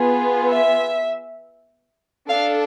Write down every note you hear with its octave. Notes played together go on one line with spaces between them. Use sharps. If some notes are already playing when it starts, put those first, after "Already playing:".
Already playing: B3 F4 G#4
E5
D4 A4 F5